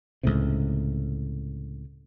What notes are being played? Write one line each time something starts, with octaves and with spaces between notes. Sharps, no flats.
C#2 A2 C3